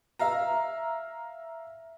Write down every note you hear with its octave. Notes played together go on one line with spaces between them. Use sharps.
E5 F5 A#5